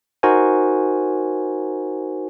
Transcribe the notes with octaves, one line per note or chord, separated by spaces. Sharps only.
D#4 F#4 A#4 C5 G#5